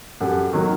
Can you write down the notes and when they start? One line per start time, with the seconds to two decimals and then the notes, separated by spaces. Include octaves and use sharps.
0.20 F#2 G4 A4
0.53 D#3 F#3 A#3